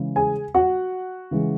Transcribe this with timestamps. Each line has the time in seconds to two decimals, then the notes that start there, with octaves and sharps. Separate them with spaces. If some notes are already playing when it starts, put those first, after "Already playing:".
Already playing: C#3 E3 G#3
0.16 G#4 G#5
0.54 F#4 F#5
1.31 C#3 E3 G#3